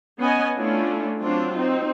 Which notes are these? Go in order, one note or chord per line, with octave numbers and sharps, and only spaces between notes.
B3 C#4 D#5 G#5
A3 C#4 D4 E4 F4
F#3 C4 D4 F4
C4 D#4